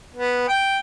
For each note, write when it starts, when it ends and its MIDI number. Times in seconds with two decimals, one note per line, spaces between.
0.15 0.44 59
0.48 0.78 79